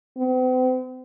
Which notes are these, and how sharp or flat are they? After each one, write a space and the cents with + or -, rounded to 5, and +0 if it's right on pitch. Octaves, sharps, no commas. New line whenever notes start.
C4 -45